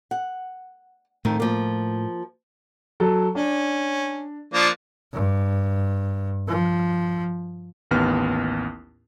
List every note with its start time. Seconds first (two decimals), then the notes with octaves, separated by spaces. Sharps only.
0.11 F#5
1.25 F2 A2 D#3 A3
1.40 F3 A#3
3.00 F#3 A4
3.35 C#4 D4
4.54 F3 A#3 D4
5.13 G2
6.48 F3
7.91 A1 D#2 B3 F6